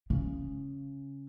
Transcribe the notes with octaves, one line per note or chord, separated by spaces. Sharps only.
C#3